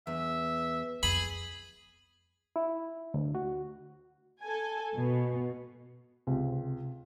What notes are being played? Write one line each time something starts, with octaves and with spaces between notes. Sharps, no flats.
E2 E5
F2 G#4 B5
E4
D2
F#4
A4 G#5
B2
C#2 C3